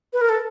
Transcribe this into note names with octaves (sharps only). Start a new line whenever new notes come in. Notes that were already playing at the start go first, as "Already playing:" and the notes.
B4
A#4
A4